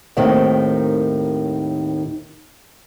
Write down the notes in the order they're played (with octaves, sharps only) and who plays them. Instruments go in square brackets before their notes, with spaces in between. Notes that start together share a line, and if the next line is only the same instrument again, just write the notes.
[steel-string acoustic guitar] D#2 A2 D#3 C4 D#4